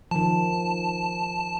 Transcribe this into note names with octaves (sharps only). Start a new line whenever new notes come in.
D#3 F3 A5